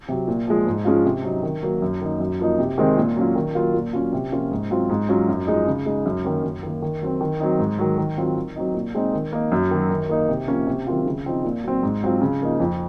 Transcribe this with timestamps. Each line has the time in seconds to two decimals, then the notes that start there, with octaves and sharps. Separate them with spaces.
0.08 C3 F#3
0.28 A#2
0.47 F3 G#3
0.67 G#2
0.85 F3 G#3 C#4 F4
1.05 C3
1.24 F#3 C4 D#4
1.43 D#3
1.62 F#3 A#3
1.82 F#2
2.01 D#3 A#3 D#4
2.20 F#2
2.39 F3 A#3 D#4
2.59 C3
2.78 D#3 G#3 C4 D#4
2.97 A#2
3.16 F#3 C#4 F4
3.36 D#3
3.55 F#3 A#3 F4
3.74 A#2
3.93 F#3 C#4 F4
4.13 C3
4.32 F3 A#3 C#4 F4
4.51 G#2
4.71 F#3 C4 F4
4.90 G#2
5.09 F#3 C#4 F4
5.28 F#2
5.47 F3 G#3 D#4
5.67 C#3
5.86 G#3 D#4
6.05 F#2
6.24 D#3 F#3 A#3 C#4
6.43 F#2
6.63 D#3 A#3
6.82 D#3
7.02 F#3 C4
7.21 D#3
7.40 F#3 C4 D#4
7.59 G#2
7.78 D#3 F#3
7.98 D#3
8.17 F#3 C4 F4
8.36 D#3
8.56 F#3 C4 D#4
8.74 A#2
8.95 G#3 C4 D#4
9.13 D#3
9.32 A#3 D#4
9.52 F#2
9.71 D#3 F#3
9.90 D#3
10.09 A#3 D#4
10.29 C3
10.48 F3 A#3 C#4
10.67 C3
10.87 D#3 F#3 C4 F4
11.06 C#3
11.25 F3 C4 D#4
11.44 A#2
11.63 F#3 C4
11.83 G#2
12.02 F#3 C4 F4
12.21 C#3
12.40 F3 A#3 D#4
12.60 F2